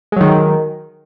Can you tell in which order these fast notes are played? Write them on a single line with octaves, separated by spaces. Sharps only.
G#3 F#3 D#3